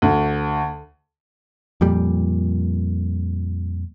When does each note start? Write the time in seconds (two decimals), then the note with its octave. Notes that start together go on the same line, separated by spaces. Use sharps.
0.02 D2
1.81 F2 A#2 G3